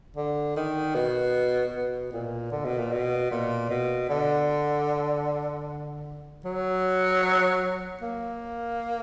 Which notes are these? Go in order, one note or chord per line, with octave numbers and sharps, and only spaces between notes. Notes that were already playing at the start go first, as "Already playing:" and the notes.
D3
D#3
B2
B2
A#2
D3
B2
A#2
B2
A#2
B2
D3
F#3
A#3